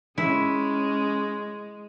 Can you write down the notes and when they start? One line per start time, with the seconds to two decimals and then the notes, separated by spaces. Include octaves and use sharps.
0.18 G#3 C#4 E4